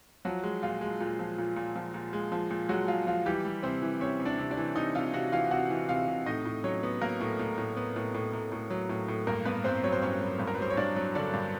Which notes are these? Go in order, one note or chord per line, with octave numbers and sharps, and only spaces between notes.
F3 F#3 F#4
G#3
A#2 F4
G#3
A#2
F3
A#2
A#2
F3
A#2
G#3
F3
A#2
F#3 G#3 F#4
G#3 F4
F3 F4
E3 G3 G4
G3
C3 C4 C5
E3
C3 C#4 C#5
C3
D4 D5
C3
D4 D5
E3
C3 D#4 D#5
C3 F4 F5
C3 F#4 F#5
E3 F4 F5
C3 F#4 F#5
E3
C3 F4 F5
C3
A2 D#4 D#5
A2
F#3 C#4 C#5
B3
F#3 A#3 A#4
A2
A2
A2
B3
A2
A2
A2
A2
F#3
A2
A2
G2 A#3 A#4
G2 B3 B4
G2 C4 C5
F#3 C#5
C5
G2 C#4 C#5
F#3
G2
A#4
B4
F#3 C5
C#5
G2 D4 D5
F#3
D3 D4 D5
G2